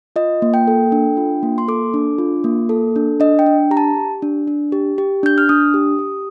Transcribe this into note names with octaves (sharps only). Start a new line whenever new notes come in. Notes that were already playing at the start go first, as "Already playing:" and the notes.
F4 D#5
A#3
G5
A4
D4
F4
A#3
C6
A4 D6
D4
F4
A#3
A4
D4
D4 D#5
G5
D4
G4 A#5
A5
G4
D4
D4
G4
G4
D4 G6
F6
D4 D#6
G4
G4